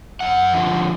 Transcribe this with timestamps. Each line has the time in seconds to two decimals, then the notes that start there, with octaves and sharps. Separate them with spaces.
0.20 F#2 F#5
0.54 D3 F3